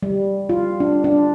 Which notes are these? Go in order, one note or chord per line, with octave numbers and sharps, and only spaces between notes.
G3
F4
D4
D4